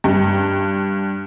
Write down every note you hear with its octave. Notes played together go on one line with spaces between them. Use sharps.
G2